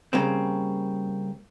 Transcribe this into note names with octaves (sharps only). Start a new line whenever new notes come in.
C#3 G3 A#3 C4